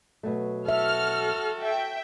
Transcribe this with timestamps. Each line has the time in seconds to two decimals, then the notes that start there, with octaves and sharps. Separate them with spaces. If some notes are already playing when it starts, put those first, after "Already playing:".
0.23 B2 F#3 A3
0.69 F#4 A4 E5 F6
1.61 E5 G5